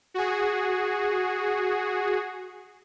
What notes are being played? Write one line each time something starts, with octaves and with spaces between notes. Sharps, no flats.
F#4 G#4